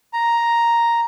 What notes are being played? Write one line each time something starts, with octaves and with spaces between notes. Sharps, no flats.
A#5